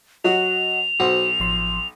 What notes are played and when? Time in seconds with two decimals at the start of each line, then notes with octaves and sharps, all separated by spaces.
0.24 F#3 F#4 D#5 F#5 F7
1.00 B1 F#4 C5
1.40 A1 F3 C6